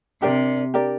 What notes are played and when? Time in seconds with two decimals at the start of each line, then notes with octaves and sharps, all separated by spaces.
0.22 C3 D4 G4 A#4 D5
0.74 D4 G4 A#4 D5